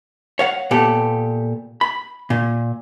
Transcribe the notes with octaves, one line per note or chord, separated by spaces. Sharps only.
C#5 F5 F#5
A#2 B3 G4 A4
B5
A#2